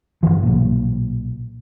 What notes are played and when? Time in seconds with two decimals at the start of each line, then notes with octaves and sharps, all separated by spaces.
0.23 G1 C#2 E3 F3
0.43 B1 A#2